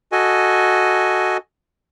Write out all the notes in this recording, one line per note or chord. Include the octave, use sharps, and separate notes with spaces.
F#4 A4 D#5 G#5